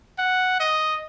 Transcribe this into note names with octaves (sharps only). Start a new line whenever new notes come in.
F#5
D#5